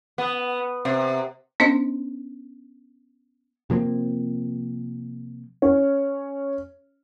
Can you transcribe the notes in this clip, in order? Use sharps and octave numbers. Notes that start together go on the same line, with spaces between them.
B3
C3
B3 C#4 D4 C5 D#5
C3 F3 A#3 C4
C#4